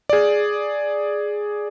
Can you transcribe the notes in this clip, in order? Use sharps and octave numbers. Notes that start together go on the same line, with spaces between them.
G#4 D5